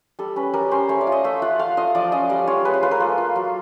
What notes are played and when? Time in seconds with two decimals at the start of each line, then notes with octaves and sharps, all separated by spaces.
0.19 G3 A4
0.36 C#4 B4
0.54 G3 A#4
0.71 C#4 C5
0.89 A3 C#5
1.01 D5
1.07 F4
1.12 D#5
1.24 A3 E5
1.42 F4 F#5
1.59 A3 F5
1.77 F4 D#5
1.95 F3 D5
2.12 C#4 D#5
2.29 G3 D5
2.48 F4 C#5
2.65 G#3 B4
2.74 C5
2.83 F4 B4
2.91 A#4
3.00 A#3 A4
3.18 F4
3.36 F#3